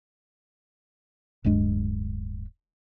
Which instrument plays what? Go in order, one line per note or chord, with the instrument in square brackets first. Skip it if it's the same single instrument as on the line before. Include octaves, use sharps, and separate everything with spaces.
[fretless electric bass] D1 G2 G#3 D4